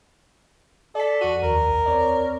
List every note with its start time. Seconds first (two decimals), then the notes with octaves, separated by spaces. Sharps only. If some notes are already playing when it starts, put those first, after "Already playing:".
0.95 A4 D5 B6
1.21 F2 F#4 D#7
1.43 D#2 A#4
1.68 A#1
1.86 C4 C#5 D5